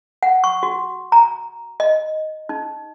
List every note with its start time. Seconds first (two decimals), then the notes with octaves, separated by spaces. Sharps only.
0.23 F#5
0.44 C#6
0.63 F#4
1.12 A#5
1.80 D#5
2.49 D#4